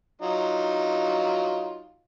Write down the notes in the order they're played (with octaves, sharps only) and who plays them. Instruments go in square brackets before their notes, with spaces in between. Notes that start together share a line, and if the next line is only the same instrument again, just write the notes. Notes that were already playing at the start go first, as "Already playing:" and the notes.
[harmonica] F#3 D#4 F4